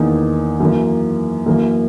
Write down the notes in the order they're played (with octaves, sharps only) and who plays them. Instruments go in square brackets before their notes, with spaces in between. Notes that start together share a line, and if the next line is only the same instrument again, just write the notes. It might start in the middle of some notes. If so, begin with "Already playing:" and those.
Already playing: [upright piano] E2 D#3 A#3 D#4
F#2 E3 A#3
F#2 E3 A#3